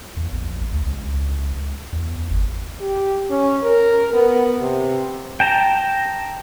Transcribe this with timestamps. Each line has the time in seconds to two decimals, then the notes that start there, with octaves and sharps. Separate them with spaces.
0.17 E2
0.32 A#1
0.72 D2
0.86 C#2
1.92 E2
2.30 G1
2.80 G4
3.30 C#4
3.63 A#4
4.14 B3
4.61 C3
5.40 G5 A5 A#5